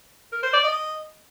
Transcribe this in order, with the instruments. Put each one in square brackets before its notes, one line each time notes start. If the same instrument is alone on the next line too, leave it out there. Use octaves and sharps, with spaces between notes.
[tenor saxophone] A#4
C5
D5
D#5